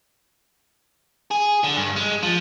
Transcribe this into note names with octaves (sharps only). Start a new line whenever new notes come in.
G#4
D3
G2
G#3
F3